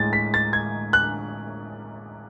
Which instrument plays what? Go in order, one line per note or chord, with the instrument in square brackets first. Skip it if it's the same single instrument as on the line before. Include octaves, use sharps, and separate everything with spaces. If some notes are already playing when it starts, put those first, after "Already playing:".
Already playing: [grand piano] A2 G#3 A6
B6
A6
G#6
F#6